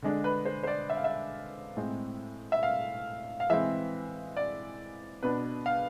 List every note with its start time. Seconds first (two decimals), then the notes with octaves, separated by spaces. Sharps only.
0.02 D3 G#3 D4
0.24 B4
0.45 C5
0.63 C5
0.67 D5
0.90 E5
0.97 F5
1.04 E5
1.77 A2 G#3 C4
2.52 E5
2.63 F5
3.40 F5
3.50 E3 G#3 C4 E5
4.37 D5
5.23 B2 B3 D4 B4
5.66 F5